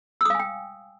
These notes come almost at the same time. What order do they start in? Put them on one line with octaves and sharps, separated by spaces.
E6 D#6 F5 G#5 G5